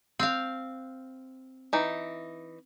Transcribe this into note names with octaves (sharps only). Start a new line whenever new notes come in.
C4 F5
E3 D#4